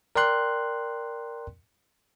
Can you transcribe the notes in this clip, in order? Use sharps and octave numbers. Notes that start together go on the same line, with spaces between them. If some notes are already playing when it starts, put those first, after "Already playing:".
A#4 D5 G5 C6 F#6